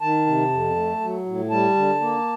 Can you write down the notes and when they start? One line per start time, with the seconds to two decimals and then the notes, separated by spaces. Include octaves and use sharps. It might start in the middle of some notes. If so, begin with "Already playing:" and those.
0.01 D#3 A5
0.27 C3
0.51 F2
0.76 A3
1.00 F#3
1.26 A2
1.50 G3 A5
1.76 D3
2.01 A#3